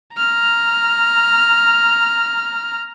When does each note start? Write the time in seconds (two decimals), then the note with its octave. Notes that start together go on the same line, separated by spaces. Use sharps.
0.17 A#5 F6